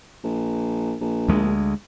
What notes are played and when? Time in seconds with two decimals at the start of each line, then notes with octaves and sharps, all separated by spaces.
0.24 A#1
1.01 A#1
1.28 D2 G#3